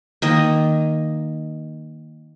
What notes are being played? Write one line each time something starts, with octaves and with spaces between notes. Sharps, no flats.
D#3 A#3 D#5